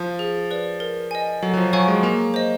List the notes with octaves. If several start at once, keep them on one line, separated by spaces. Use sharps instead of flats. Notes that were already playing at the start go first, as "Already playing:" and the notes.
Already playing: F3
G#4
B4 D5
A#4
D#5 G#5
F#3 A4
F#3
F3
F#3 C#5 F5 G#5 C#6
G#3
A#3 G#4
C5 D#5